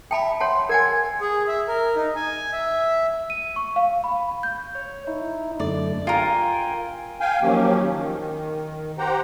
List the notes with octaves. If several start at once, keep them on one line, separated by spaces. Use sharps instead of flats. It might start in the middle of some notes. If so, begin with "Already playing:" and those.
E5 G5 A5 B5
C#5 F#5 A5 C6
A#4 F#5 G#5 G#6
G#4
E5
A#4
D#4
G#5
E5
D#7
C#6
F5
B5
G6
C#5
D#4 E4
F#2 D3 A3 D5
F4 A#4 G5 G#5
F5 G5 G#5
D#3 F3 F#3 A#3 C#4 G4
D#3
G4 C5 F#5 G5 A#5